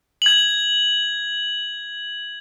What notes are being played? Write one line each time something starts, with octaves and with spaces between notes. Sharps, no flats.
G#6 F#7